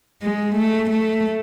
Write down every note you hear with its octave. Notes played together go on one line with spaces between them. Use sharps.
G#3
A3
A3